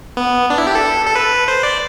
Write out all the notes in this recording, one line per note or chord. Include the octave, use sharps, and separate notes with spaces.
B3
D4
E4
G4
A4
A4
B4
C5
D5